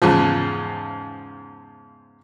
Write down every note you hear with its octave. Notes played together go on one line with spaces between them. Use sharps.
E2 G#2 C#3 F3